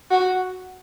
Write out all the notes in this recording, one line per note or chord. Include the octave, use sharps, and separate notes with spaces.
F#4